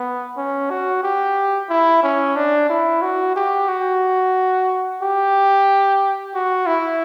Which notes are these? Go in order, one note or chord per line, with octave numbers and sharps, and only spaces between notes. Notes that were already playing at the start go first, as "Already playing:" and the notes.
Already playing: B3
C#4
F#4
G4
E4
C#4
D4
E4
F#4
G4
F#4
G4
F#4
E4